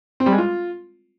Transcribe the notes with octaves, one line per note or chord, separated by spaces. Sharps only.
C4
G3
G#3
F4